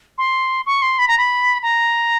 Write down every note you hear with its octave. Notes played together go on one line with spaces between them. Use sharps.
C6
C#6
C6
B5
A#5
B5
A#5